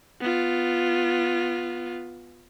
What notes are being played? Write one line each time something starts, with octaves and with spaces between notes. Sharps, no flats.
B3 F4